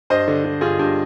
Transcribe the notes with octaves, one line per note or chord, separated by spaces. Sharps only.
G2 C5 D#5
D3
D3
G2 F4 G#4
G2